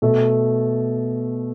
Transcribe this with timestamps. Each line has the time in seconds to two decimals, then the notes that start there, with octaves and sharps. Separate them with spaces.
0.02 B2 A3